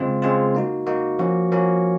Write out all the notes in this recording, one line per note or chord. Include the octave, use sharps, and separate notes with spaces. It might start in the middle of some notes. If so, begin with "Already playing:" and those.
Already playing: C#3 G#3 C4 F4
C#3 G#3 C4 F4
A#3 D#4 F#4
A#3 D#4 F#4
F3 A#3 C#4 F#4
F3 A#3 C#4 F#4